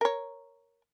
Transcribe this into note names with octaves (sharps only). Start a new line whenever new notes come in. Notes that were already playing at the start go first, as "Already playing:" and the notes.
A#4 C#5